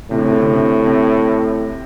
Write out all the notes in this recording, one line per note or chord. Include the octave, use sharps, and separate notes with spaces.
A2 C3
D3
C3
D3
C3
D3
C3
C3